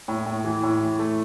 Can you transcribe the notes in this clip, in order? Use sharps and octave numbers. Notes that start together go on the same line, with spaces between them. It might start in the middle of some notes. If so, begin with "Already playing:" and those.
A2
A2
E3
A2
E3
A3